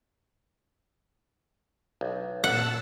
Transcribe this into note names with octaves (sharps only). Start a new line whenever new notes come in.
B1
A#2 F#5 A5 E6